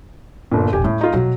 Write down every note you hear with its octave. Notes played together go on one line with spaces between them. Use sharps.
G1 A#2
E1 A1 G4 G#5
A2 G#3
D#4 F4
D2 B2 F#3